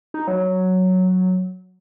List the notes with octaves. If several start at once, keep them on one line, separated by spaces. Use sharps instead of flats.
D#4
F#3